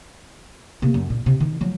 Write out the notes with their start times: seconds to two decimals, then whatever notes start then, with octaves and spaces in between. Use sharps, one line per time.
0.82 C3 A#3
0.94 F#2
1.10 A#2
1.26 C3
1.40 D#3
1.61 F3 F#3